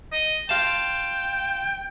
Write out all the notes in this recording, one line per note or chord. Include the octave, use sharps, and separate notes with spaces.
D#5
F4 F5 G5 A5